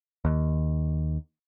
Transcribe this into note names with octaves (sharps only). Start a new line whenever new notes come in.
D#2